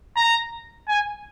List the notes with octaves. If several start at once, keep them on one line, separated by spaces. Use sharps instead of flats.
A#5
G#5